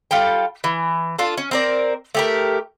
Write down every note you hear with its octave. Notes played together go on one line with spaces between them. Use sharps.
G3 F4 A4 G5
E3
D4 F4 A4
C#4
C4 A#4 D5
A3 G4 A#4